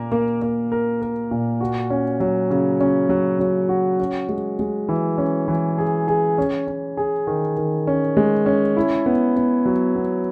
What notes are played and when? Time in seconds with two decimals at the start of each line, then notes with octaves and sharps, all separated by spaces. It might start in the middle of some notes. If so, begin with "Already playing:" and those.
Already playing: A#2 A#3 A#4
0.12 A#3
0.42 A#3
0.72 A#4
1.02 A#4
1.31 A#2
1.60 F#4
1.90 C#4
2.20 F#3
2.50 C#3
2.81 C#4
3.09 F#3
3.39 F#3
3.69 F#4
3.99 C#4
4.29 G#3
4.59 G#3
4.89 E3
5.18 C#4
5.48 E3
5.78 G#4
6.08 G#4
6.38 C#4
6.67 C#4
6.97 G#4
7.27 D#3
7.57 D#3
7.87 C#4
8.17 G#3
8.46 C#4
8.77 E4
9.06 B3
9.36 B3
9.65 F#3
9.96 B3